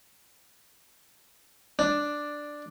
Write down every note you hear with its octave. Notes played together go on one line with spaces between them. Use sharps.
D4